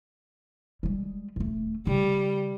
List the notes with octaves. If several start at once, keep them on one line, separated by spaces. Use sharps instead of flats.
G3 G#3
D#1 A3
C#3 G3